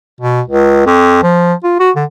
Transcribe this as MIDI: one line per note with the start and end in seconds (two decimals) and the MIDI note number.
0.20 0.41 47
0.48 0.85 37
0.86 1.22 41
1.23 1.53 53
1.63 1.79 65
1.79 1.90 66
1.95 2.04 50